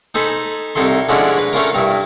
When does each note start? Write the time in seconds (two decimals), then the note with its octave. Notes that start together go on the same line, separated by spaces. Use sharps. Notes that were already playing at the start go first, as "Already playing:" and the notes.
0.14 D#4 A4 C5 G#5 B5
0.75 C2 D#4 E4 A4 C6
1.09 D3 F3 G#3 C#4 D4 E4
1.38 B4
1.53 A3 C#4 F4 A#4
1.75 G2 E4